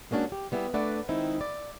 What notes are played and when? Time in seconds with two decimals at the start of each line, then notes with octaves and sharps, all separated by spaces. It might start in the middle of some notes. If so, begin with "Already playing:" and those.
0.11 G#3 A#3 C#4 D4 F#4
0.32 G4
0.52 G3 B3 E4 G#4
0.74 A3 D4 B4 D5 E5 F#5
1.08 D#3 G#3 C4 D#4 E4
1.41 D5